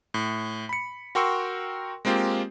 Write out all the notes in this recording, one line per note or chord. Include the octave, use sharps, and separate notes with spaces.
A2
B5 C#7
F#4 A#4 G5 C6 C#6 E6
G#3 A#3 C4 F4 G4